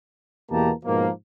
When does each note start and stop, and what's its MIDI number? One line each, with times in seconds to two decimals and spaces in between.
0.50 0.71 40
0.50 0.71 47
0.50 0.71 58
0.50 0.71 67
0.50 0.71 81
0.50 0.71 82
0.84 1.10 44
0.84 1.10 47
0.84 1.10 53
0.84 1.10 58